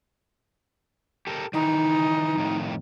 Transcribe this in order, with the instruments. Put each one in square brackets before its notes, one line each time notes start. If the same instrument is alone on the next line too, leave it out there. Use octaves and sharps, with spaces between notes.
[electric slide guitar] G4 A4 A#4
[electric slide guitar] D#3 E3 [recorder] D#4
[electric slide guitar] F2 A2 D#3